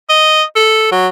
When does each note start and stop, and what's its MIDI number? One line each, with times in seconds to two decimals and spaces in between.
0.10 0.43 75
0.56 0.90 69
0.92 1.08 54